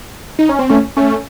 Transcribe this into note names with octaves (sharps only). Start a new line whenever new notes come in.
D#4
C#4
C4
A3 C#4
A3 C#4